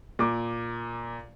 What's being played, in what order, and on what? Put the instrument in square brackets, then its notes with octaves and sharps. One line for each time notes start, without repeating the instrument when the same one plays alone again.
[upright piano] A#2 D6